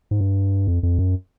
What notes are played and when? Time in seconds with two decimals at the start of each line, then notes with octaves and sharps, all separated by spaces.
0.11 G#2
0.21 G2
0.67 F2
0.83 F2
0.98 F#2